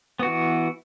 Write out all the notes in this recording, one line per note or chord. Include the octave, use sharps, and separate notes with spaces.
E3 B3 F#4